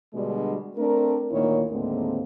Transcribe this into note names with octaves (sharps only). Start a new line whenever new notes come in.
B2 D3 G3 G#3 D4 F#4
A3 C4 D4 A#4
D2 A#2 D#3 E4 A#4 C#5
D#2 A2 D3 G#3 A#3 C4